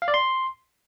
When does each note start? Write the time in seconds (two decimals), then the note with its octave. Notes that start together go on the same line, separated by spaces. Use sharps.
0.02 F5
0.08 D5
0.14 C6